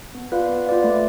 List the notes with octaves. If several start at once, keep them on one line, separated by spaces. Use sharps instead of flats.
B3
F4 B4 D5 F5
B3
F4 B4 D5 F5
A3